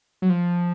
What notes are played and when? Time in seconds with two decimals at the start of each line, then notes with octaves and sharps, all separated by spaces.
0.22 F#3
0.30 F3